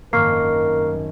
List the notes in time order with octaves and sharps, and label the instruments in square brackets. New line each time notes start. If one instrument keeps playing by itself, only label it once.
[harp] G#1 F#2 D#3 [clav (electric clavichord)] A#3 [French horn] A#4 [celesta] C#6 F6 C7